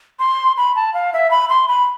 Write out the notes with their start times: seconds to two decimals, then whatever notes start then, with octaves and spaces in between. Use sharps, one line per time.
0.19 C6
0.57 B5
0.76 A5
0.94 F5
1.13 E5
1.31 B5
1.49 C6
1.68 B5